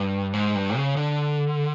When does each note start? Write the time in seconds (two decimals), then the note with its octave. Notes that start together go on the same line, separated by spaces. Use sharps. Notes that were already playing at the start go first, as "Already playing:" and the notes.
Already playing: G2
0.34 G#2
0.55 G2
0.76 C#3
0.96 D3